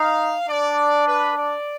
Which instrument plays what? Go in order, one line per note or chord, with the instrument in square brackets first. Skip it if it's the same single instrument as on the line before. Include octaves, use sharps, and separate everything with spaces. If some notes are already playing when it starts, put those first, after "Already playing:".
Already playing: [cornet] D#4 [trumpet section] F5
[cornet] D4 [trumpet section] D5
[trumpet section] B4
D5